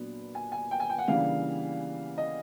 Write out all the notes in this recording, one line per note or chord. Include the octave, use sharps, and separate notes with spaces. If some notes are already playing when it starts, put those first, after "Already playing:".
Already playing: A#2 F#3 B3 D4
G#5
G#5
G5
G#5
G5
F#5
C#3 E3 G3 A#3 D4 F5
D#5